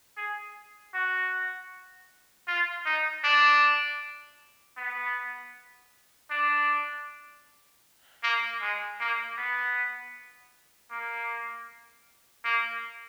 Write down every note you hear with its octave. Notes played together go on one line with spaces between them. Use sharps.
G#4
F#4
F4
D#4
D4
B3
D4
A#3
G#3
A#3
B3
A#3
A#3